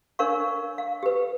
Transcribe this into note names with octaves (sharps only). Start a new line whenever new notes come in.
D4 A#4 C#5 F5 C#6
F5
G4 B4